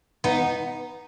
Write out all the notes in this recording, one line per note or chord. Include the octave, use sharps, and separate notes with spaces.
B3 D#4